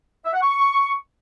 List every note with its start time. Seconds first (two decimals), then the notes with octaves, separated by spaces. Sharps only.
0.25 E5
0.33 F#5
0.42 C#6